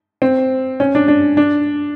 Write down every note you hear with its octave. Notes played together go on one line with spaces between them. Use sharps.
C4
C#4
D4
D4
D4